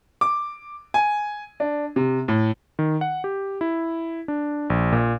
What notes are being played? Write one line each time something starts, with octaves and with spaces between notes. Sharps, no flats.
D6
G#5
D4
C3
A2
D#3
F#5
G4
E4
D4
A#1
A#2